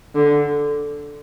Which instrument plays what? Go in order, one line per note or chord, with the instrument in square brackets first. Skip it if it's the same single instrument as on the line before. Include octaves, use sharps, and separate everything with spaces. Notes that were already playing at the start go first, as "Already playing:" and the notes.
[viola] D3